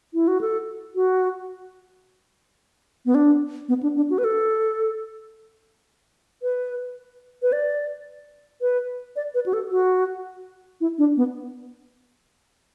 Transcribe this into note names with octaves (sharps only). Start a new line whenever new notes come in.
E4
F#4
A4
F#4
B3
D4
B3
D4
D4
F#4
B4
A4
B4
B4
D5
B4
D5
B4
F#4
A4
F#4
E4
D4
B3